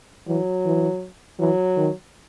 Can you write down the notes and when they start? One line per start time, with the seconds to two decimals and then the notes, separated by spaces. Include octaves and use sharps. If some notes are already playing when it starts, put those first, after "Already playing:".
0.28 E3 F#3
0.65 E3
1.39 E3 F#3
1.77 D#3